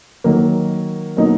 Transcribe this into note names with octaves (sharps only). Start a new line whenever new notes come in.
D#3 F#3 A#3
B2 F#3 A#3 D#4